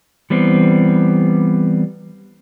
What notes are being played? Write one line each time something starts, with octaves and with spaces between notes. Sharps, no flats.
E3 G3 B3 C4